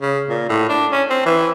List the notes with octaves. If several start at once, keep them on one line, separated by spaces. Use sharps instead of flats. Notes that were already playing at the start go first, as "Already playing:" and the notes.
C#3
A#2
A2
D4
C#4
C4
E3